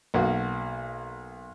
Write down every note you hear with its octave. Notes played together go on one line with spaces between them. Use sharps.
B1 A#3 F#4